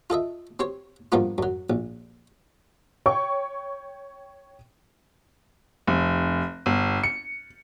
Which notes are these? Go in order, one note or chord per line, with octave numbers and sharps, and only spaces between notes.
F4 A4 D#5 E5
C4 G4 C5 C#5
G2 F3 A#3 B3 D4 F4
F#2 F#3
A#1
C#5 G5 C#6
F1
G1
C#7